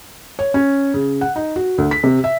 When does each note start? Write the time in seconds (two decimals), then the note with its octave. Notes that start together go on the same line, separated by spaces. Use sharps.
0.39 C#5
0.54 C#4
0.94 C#3
1.21 F#5
1.36 D#4
1.56 F#4
1.78 D2
1.91 B6
2.04 C3
2.24 E5